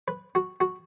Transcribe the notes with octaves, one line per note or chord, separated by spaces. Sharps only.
B4
F#4
F#4